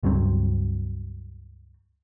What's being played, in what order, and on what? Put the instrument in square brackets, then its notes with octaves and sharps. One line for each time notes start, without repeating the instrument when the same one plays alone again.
[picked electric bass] C#2 G2 F#3 C4